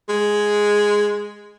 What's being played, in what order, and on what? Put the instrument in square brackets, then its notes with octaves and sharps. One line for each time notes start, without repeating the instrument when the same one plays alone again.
[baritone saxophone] G#3